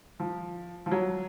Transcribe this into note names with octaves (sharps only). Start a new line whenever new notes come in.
F3
F3
F#3